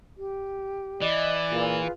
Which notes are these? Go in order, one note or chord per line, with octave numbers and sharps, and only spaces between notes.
G4
E3 D5 D#5
A#2 F4 G#4 B4